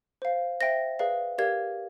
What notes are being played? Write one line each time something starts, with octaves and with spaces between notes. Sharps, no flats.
C5 F5
C5 E5 G5 A#6
G#4 B4 D5 F5
G4 A#4 D5 F5 G#6